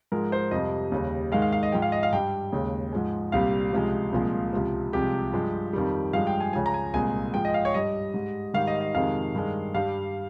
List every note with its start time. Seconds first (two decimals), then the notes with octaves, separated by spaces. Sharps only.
0.12 G#2 F3 G#3 A#4
0.32 C5
0.51 F2 C3 G3 D#5
0.92 D#2 C#3 G3
1.32 G#2 D#3 G#3 F5
1.42 F5
1.52 F5
1.63 D#5
1.72 G#2 F3 G#3 G5
1.82 F5
1.92 D#5
2.03 F5
2.12 G2 G3 G5
2.52 D#2 C#3 G#3
2.92 G#2 F3 G#3
3.32 C2 A#2 G3 F5
3.73 C#2 C3 F3 G#3
4.12 C2 A#2 F3 G#3
4.53 C#2 C3 F3
4.93 C2 C3 F3 G#3 G4
5.33 G2 F3 G#3
5.73 F2 D#3 G3
6.13 G2 F3 G#3 F5
6.27 G5
6.40 G#5
6.53 C#2 C#3 F3 G#5
6.66 A#5
6.74 G#5
6.94 C2 A#2 G#3 G#5
7.34 G#2 F3 G#3 G5
7.45 D#5
7.54 F5
7.65 C#5
7.74 G2 G3 D#5
8.14 G#2 G3
8.54 G#2 D#3 G3 F5
8.67 D#5
8.81 D#5
8.94 F2 C3 D#3 G#3 F5
9.35 G2 D#3 G#3
9.75 G2 G3 F5